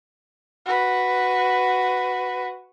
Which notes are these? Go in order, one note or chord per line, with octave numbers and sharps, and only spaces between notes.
F#4 B4